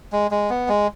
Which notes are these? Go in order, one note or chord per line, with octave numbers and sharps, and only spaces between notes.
G#3
G#3
B3
G#3